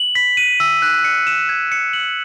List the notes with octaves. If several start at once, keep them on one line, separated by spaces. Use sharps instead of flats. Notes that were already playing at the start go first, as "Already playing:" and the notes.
Already playing: F#7
B6
D#7
E6
F#6
C#7
E7
G#6
C#7
F#7